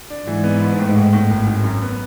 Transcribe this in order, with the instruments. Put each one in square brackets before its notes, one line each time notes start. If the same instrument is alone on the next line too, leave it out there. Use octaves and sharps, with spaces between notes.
[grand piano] D4
[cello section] G#2 [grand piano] E3
[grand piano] B3
B3
A2
A2
A2
G#1
G#1
F#2
B3